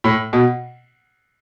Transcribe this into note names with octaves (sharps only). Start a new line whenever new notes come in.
A2
B2